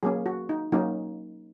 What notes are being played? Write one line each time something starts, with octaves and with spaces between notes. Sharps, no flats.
F#3 A#3 C#4 G#4
F#4
D#4
F#3 A#3 C#4 D#4